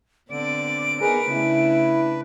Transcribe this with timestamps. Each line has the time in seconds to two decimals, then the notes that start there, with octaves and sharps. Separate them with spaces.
0.31 D3 B3 C4 D5 D7
1.01 B3 D#4 G#4 A#4 B4
1.31 C#3 A3 D4 E4